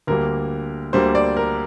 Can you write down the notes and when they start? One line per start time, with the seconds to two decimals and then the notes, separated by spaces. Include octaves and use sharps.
0.07 D2 D3 G3 A#3 A#4
0.93 D2 D3 G3 A#3 C5
1.15 D5
1.37 A#4